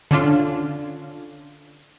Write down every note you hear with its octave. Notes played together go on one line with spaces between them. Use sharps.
D3 C#4 D4 F4